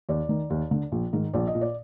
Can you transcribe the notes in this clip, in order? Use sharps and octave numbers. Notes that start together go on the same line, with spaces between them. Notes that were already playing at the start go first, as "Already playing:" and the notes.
D#2 D5
D#3
D#2
D3
A#1
G#2 D#3
A#1 D5
D#5
A#2
D5